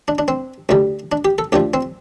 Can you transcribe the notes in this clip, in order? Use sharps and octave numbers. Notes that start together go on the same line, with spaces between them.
D4
D4
C4
D2 D3 G3
D4
G4
A4
D2 D3 F3 G4
C4